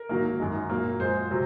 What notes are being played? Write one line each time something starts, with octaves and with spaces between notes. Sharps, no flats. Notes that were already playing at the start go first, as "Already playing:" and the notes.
Already playing: A#4
G#2 D#3 F#3 A#3
F#2 D#3 G#3
A#2 F#3 A#3
F#2 F3 G#3 C5
C3 F#3